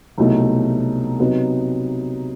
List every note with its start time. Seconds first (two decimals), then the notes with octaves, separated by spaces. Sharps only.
0.18 C2 B2 F#3 A3 D#4
1.20 C3 F#3 B3 D#4